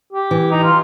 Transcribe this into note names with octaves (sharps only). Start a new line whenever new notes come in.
G4
E3
D#4
F4